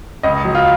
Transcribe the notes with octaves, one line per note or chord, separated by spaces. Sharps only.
C#2 D#5
F#3
F4